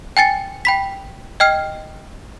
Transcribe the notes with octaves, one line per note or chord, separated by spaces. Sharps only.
G5 G#5 A6 C#7
G5 B5 B6
D#5 G5 F6 C7